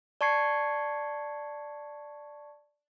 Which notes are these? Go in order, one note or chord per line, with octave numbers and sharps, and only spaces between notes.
D5 A5 C#6 G#6 C7 C#7